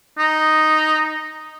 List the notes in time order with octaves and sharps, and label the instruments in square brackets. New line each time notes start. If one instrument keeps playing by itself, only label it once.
[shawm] D#4